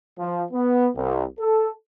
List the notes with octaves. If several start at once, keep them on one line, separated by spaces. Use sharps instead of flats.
F3
B3
C2
A4